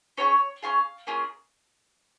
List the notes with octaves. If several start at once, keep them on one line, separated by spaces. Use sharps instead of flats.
C#4 F4 G#4 C#5
C#4 F4 G#4 F5
A#3 C#4 F4 G#4